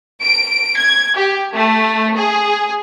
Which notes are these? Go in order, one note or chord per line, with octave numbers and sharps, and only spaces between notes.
D7
G#6
G4
A3
G#4